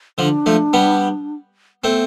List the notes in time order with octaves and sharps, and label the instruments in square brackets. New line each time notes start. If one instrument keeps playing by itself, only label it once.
[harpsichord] D3 F3 [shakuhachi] D4
[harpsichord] F3 A3
G3 B3
[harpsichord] A3 C4 [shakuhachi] B3